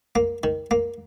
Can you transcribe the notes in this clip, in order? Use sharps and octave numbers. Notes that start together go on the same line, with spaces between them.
A#3
D#3
A#3